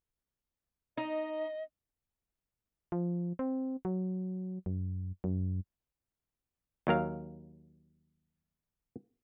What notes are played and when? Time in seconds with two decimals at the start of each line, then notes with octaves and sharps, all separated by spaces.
0.97 D#4 D#5
2.92 F3
3.39 C4
3.85 F#3
4.66 F#2
5.24 F#2
6.87 D#2 F#3 A#4 F5